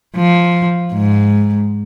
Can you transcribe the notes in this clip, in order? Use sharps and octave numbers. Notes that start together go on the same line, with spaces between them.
F3
G#2